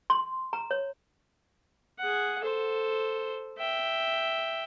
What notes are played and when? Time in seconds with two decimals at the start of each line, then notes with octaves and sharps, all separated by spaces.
0.10 C6
0.53 A#5
0.71 C#5
1.99 G#4 F#5
2.42 A4 C5
3.58 E5 G5